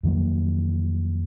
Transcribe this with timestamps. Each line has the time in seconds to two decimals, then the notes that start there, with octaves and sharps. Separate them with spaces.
0.03 F2 D#3 F#3 A#3